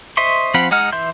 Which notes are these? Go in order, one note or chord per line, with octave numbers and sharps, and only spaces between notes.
C5 D#5 E5 C6 C#6
F3 C4 F5 F#5 B5
G#3 D#4 F#5 F6
E3 E5 C6 G6